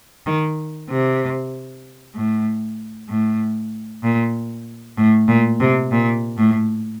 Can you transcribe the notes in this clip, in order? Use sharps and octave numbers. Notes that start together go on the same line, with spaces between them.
D#3
C3
A2
A2
A#2
A2
A#2
C3
A#2
A2